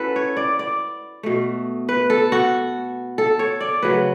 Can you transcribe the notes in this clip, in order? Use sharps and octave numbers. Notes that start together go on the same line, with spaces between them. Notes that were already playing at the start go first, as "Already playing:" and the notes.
Already playing: C#4 E4 F#4 A4 B4
C#5
D5
D5
B2 A3
B4
A4
F#4
A4
C#5
D5
C#3 F#3 A3 B4